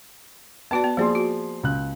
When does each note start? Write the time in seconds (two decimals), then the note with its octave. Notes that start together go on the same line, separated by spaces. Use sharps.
0.71 B3 F#4 B4 D5 A5
0.84 B3
0.97 F3 A#3 G#4 D5 C6
1.15 F#4
1.63 C#2 F#6